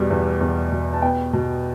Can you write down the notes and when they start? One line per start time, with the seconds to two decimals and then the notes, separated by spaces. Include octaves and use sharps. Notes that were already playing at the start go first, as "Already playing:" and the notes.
Already playing: E2 B2 G3
0.10 E2
0.41 E2
0.72 B2
0.94 A5
1.02 B3 G5
1.33 B2